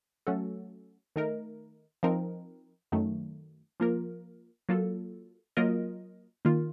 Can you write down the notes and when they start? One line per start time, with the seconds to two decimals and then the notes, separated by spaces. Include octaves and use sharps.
0.27 F#3 A3 C#4 F#4 A4
1.16 D#3 A3 D#4 A#4
2.03 F3 C4 D#4 A#4
2.92 F#2 D#3 F#3 A3
3.80 F3 A#3 F4 A#4
4.69 F#3 A#3 F4 A4
5.57 F#3 A#3 F4 A#4 D#5
6.45 D#3 A#3 F4